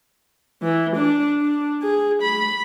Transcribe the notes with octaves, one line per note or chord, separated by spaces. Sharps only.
E3
D4
D4
G#4
B5